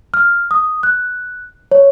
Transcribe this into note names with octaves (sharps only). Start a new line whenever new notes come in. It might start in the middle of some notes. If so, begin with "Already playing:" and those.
F6
D#6
F#6
C#5